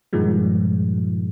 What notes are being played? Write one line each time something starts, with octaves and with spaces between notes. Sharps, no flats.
G2 A#2 D#3 F3 G#3